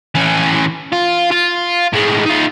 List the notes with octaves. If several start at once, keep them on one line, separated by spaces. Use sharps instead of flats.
E3 C#4
F4
F4
A2 G#3
D#4 F4